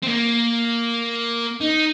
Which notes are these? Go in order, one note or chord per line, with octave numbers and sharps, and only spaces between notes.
C4
A#3
D#4